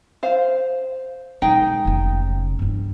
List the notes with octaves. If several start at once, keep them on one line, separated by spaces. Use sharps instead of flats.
C5 F5
B2 G#3 D#4 G5
F1 C#3
G2 D4